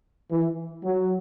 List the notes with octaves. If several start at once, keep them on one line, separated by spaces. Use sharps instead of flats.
E3
F#3